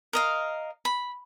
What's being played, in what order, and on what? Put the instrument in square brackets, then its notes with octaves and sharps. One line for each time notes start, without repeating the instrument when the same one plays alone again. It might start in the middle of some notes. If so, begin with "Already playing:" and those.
[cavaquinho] A#4 D#5 F5
B5